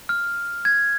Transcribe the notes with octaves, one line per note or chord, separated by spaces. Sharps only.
F6
G#6